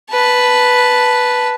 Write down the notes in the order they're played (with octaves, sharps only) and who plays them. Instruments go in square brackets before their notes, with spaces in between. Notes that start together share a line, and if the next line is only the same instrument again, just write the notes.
[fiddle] B4 A5